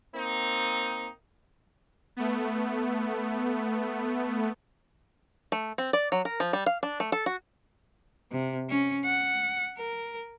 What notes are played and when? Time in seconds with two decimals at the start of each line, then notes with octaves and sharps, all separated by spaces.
0.14 A#3 C4 D#4
2.17 A3 B3
5.52 A3
5.78 C4
5.93 D5
6.12 F#3
6.25 A#4
6.40 F3
6.53 G3
6.66 F5
6.83 D4
7.00 A3
7.12 A4
7.26 F#4
8.31 C3
8.70 C#4
9.05 F#5
9.78 A#4